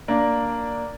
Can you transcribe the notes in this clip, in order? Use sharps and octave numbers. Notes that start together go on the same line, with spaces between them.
A#3 D4